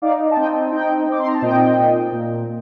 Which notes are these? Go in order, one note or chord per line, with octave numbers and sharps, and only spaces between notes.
D#4 D5 F5
A5
C4 D#5 G5
D#4 D#5 G5
C4 D6
C6
A#5
A5
A#2 D#5 G5
A#2
A#2